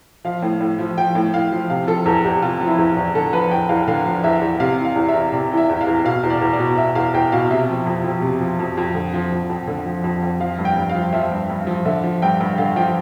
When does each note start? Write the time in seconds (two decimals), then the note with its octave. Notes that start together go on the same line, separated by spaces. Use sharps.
0.25 F3 F5
0.42 A2
0.61 A2
0.79 F3
0.98 F3 G5
1.15 A2
1.34 A2 F5
1.52 F3
1.70 C3 F5
1.87 F3 A4
2.06 E2 A4
2.24 E2 G4
2.42 C3 F4
2.61 F3
2.67 E4
2.78 E2
2.90 F4
2.97 E2
3.15 D3 A4
3.33 F3 B4
3.51 E2 G5
3.69 E2 F5
3.88 D3 F5
4.06 F3
4.24 E2 E5
4.41 E2
4.60 C3 F5
4.78 E3
4.85 F5
4.96 E2
5.08 E5
5.14 E2
5.32 C3 D5
5.51 E3
5.57 E5
5.69 E2
5.81 F5
5.87 E2
6.05 B2 F5
6.23 E2
6.30 D5
6.41 E2
6.53 D5
6.59 B2
6.77 B2 E5
6.95 E2 F5
7.14 E2 G5
7.32 B2 F5
7.50 C3 E5
7.69 F3
7.86 F2
8.04 F2
8.22 C3
8.41 F3
8.59 F2
8.77 F2
8.95 D3
9.14 F3
9.32 F2
9.50 F2
9.67 D3
9.86 F3
10.04 F2
10.22 F2
10.40 F3 F5
10.59 G2
10.65 G5
10.76 G2
10.89 F5
10.95 F3
11.13 F3 E5
11.32 G2
11.50 G2
11.67 F3
11.85 D3 E5
12.04 F3
12.22 G2 G5
12.41 G2
12.58 D3 F5
12.76 F3 G5